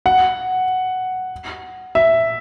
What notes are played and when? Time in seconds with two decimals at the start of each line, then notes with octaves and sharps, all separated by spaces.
0.06 F#5
1.95 E5